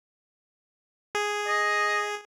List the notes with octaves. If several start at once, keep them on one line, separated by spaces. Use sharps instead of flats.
G#4
D#5